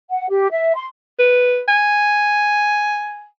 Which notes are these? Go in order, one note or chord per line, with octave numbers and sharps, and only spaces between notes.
F#5
G4
E5
C6
B4
G#5